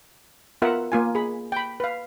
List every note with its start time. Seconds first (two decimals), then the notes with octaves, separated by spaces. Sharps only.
0.62 B3 F4 A#4 E5 F#5
0.92 A#3 F4 G#5
1.15 G#4 B5
1.52 G5 B5
1.80 B4 F5